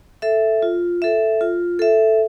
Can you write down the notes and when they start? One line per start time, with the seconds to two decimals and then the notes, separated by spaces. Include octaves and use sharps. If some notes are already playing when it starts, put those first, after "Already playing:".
0.22 A4 E5
0.62 F4
1.02 A4 E5
1.41 F4
1.79 A4 E5